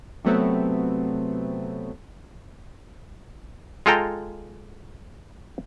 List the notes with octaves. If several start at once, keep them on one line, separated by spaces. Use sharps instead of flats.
C3 F#3 A3 B3 C4
G#3 F4 A4 G5 A#5